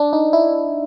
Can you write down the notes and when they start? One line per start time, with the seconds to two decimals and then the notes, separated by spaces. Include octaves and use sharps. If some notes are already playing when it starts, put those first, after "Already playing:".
Already playing: D4
0.13 D#4
0.33 E4